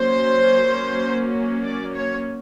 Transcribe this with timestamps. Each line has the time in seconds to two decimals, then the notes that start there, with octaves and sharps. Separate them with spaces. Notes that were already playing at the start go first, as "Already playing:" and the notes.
Already playing: F#3 A#3 C#4 C5
1.64 D5
1.94 C#5